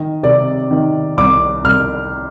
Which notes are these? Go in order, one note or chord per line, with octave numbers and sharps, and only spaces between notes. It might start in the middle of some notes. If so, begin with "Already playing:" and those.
Already playing: D#3 D#5
C3 D5
D#3
C2 D6
C2 F6